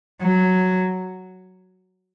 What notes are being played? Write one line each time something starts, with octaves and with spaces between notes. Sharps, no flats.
F#3